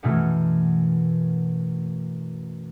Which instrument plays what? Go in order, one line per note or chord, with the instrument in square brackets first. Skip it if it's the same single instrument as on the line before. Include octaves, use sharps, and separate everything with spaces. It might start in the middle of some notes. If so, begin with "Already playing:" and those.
[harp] F#2 B2 E3 A3 F6